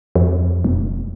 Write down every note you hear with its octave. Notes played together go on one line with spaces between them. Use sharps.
F2
E1